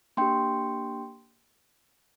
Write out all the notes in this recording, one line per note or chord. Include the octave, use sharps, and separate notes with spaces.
A#3 D4 G4 G5 C6